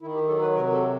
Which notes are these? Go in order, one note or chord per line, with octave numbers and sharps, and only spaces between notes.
D#3 E4
G4
F#3 A4
B4
C3 A#4
A4